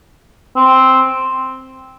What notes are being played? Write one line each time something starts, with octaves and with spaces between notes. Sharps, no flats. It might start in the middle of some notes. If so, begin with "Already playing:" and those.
C4